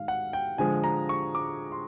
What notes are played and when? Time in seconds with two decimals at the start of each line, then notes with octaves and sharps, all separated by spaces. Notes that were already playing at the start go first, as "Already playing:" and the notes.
Already playing: G#2 D#3 F5
0.08 F#5
0.33 G5
0.58 D3 F3 G#3 G#5
0.84 A#5
1.09 C#6
1.35 D6
1.72 C6